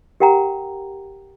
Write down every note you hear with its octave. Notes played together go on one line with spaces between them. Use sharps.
G4 A#4 F#5 G5 A#5